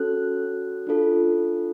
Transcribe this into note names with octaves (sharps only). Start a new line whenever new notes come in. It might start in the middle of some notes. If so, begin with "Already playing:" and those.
Already playing: C#4 F#4 A4 F#6
D4 F4 A4